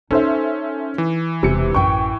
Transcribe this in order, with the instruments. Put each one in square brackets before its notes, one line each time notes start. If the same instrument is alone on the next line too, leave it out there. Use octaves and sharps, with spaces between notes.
[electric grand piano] C#4 [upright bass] D#4 [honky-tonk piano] A4 C5 E5
[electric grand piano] E3
[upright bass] E1 [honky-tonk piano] C3 C#7
[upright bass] A1 F#2 [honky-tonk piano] G5 C#6